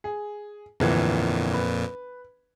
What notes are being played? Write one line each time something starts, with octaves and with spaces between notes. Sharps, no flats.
G#4
G1 F2 A#2 E3
B4